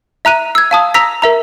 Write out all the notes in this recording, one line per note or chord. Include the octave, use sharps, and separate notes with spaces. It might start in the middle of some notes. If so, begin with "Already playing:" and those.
E5 A#5 F#6 D#7
E6 G#6
F5 A5 D#6
A#5 E6 A#6 B6
A#4 E5 A#5